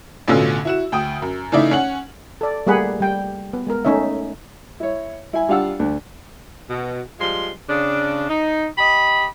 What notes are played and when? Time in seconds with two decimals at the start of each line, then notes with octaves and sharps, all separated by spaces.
0.28 A1 B2 D3 C#4 F4 E6
0.65 E4 F#4 E7
0.92 D2 G5 D#6
1.22 F#2
1.52 C#3 E3 A3 D#4 D5 E5
1.71 C#4 F#5 F#7
2.41 A4 D5
2.67 G3 A3 A#3 G#4 F#5 B5
3.00 G3 G5
3.53 B3
3.67 G#3 B3 A#4
3.85 A3 C#4 D#4 C#5 E5
4.80 E4 C#5
5.33 E4 G#5
5.48 G3 D4 F4 F5 F#5 E6
5.80 D2 D4
6.69 B2
7.20 F3 G3 G#3 C6
7.69 C#3 D4
8.29 D#4
8.77 G4 D#5 B5